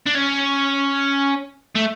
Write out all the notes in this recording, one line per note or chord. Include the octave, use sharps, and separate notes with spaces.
D4
C#4
A3